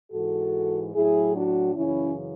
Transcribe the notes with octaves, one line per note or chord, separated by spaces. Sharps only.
G#2 E3 F#4 A4
A2 F#3 E4 G#4
D4 F#4
F#2 C#3 E3 C#4 E4